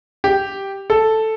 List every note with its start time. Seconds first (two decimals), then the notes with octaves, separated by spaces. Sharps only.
0.24 G4
0.90 A4